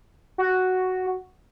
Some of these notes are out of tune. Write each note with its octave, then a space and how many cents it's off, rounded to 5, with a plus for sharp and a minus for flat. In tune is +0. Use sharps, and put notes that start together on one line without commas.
F#4 +0